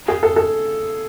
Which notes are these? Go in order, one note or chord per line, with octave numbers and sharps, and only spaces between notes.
G#4
A4
A4